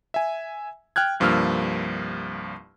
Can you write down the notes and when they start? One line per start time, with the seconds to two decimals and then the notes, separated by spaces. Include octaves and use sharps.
0.14 E5 G#5
0.96 G5 F6 F#6 G#6
1.20 C2 G2 F3 A#3 E6 F6